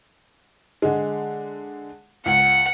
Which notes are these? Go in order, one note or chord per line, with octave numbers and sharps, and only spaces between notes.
D3 G#3
C#2 F#5